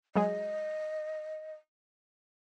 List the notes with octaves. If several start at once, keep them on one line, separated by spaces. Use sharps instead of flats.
F#3 G#3 G#4 D#5